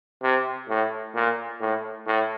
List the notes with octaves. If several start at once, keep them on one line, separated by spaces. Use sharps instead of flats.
C3
A2
A#2
A2
A2